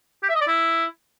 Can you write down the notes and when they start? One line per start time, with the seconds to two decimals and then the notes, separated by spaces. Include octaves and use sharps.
0.23 G4
0.29 E5
0.35 D#5
0.41 D5
0.47 E4